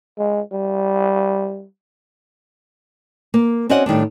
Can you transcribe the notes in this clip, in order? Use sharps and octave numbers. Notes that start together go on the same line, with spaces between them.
G#3
G3
A#3
C4 C#4 F#4 D5 D#5 F#5
A2 D#3 G3 D4